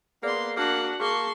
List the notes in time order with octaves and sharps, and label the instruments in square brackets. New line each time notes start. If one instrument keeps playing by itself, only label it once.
[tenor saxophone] A#3 [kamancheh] B3 C6 [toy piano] G#4 D5
[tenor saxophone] A#3 [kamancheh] D4 F#4 [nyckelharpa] F#5
[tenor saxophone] A#3 [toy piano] G#4 [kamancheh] A5 [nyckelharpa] C6 C#6